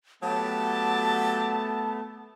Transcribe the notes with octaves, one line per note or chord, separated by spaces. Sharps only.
F#3 A3 B3 G4 A5